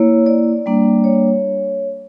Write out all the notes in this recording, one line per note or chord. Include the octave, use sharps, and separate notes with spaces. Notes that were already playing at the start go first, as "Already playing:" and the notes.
Already playing: A#3 E4 C#5
D5
G3 A#3 D4
C#5